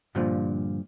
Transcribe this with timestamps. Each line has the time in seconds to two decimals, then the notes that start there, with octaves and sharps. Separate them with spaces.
0.15 G2 A#2 D3 F3